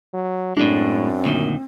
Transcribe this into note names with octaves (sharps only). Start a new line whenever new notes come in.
F#3
F#2 A2 G#3 C4 D4
D2 A#2 D#3